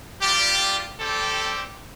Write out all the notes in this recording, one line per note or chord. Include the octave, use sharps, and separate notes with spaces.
G3 D4 F4 G4
G3 C4 G4 A4